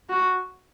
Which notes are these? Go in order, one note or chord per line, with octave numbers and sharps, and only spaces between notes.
F#4